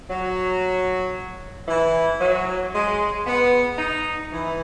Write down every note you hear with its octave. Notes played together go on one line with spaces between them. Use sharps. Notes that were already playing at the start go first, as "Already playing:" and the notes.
F#3
E3
F#3
G#3
B3
D#4
E3